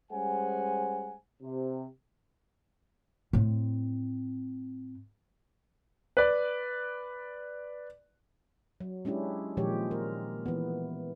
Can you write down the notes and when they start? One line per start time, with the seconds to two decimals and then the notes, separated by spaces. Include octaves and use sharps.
0.12 G3 G#3 C#4 C5 F#5 G#5
1.42 C3
3.33 A2 C4
6.17 B4 D5
8.81 F#3
9.05 G#3 C#4 D4 E4 G4
9.57 A#2 D#3 F3 G#3 G4 C#5
9.91 A#4
10.46 E3 B3